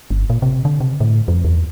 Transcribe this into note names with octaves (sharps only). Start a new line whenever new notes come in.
G1
A#2
C3
D3
C3
A2
F2
E2